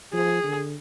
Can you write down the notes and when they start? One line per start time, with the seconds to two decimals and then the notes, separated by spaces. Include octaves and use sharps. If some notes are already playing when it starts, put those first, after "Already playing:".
0.13 F3 G#4
0.44 D3